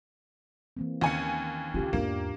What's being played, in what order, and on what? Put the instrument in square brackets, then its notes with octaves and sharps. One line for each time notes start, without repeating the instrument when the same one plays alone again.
[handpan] E3 A#3 C4
[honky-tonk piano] D#2 G#5 C#7 [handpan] C#4
[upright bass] D3 C#4 [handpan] F4 G4
[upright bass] E2 G#2 [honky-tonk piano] A#3 [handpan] D4